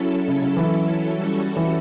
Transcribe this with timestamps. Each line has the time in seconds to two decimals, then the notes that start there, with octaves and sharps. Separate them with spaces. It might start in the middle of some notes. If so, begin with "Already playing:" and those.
Already playing: F#3 C#4 E4 A4
0.28 C#3
0.42 C#3
0.57 E3
1.14 G3 C#4 F#4 A4
1.57 E3